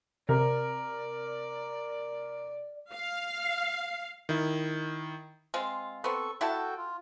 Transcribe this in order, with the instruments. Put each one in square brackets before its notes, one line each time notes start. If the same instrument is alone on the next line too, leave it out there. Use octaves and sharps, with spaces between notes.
[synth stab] C3 [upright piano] A#4 [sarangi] D5
[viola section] F5
[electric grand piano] D#3 E4
[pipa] G#3 C4 F4
[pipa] B3 C4 [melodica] A4 C#6
[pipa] E4 F#5 A5 [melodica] F#4 A4 G5
[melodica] F4